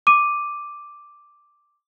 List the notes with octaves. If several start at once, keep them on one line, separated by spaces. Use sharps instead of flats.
D6 D#7